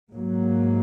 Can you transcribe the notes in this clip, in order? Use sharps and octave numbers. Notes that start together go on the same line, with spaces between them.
G#2 F#3 A#3